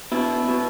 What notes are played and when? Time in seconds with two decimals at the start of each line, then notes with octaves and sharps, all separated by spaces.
0.12 B2 E4
0.48 B2